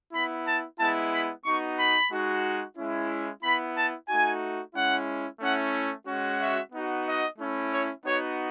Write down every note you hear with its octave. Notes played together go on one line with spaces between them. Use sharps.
B3 E4 B5
A5
G#3 B3 E4 A5
B5
B3 D#4 F#4 C#6
B5
G#3 D#4 F#4
G#3 C#4 E4
B3 E4 B5
A5
A3 D#4 F#4 G#5
G#3 C#4 E4 F#5
A3 C#4 E4 F#5
G#3 C#4 F#4
E5
B3 D#4 F#4
D#5
A3 C#4 E4
C#5
B3 D#4 F#4 C#5